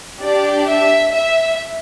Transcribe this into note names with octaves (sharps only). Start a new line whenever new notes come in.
D4 G4 D5
E5
E5